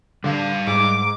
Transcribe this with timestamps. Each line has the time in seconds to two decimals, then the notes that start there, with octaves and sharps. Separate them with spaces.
0.24 D3 G3 F5
0.67 G#2 D6